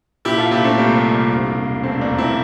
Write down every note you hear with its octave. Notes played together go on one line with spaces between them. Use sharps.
A#2 E4 G4
F4 A4
A#2 E4 G4
A3 C4
C2 G3 A#3
C2
E1
E1
E1 A3 C4
A#3 D4
E1
C4 E4